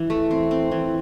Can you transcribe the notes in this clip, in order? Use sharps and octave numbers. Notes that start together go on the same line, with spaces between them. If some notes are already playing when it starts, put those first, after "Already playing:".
Already playing: E3
A3
C4
C4
E3